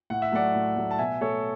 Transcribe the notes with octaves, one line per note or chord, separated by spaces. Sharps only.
A2 F#5
E5
F#3 A3 D5 F#5
A2
F#3 A3
A5
B2 E5 G#5
A3 A4 C#5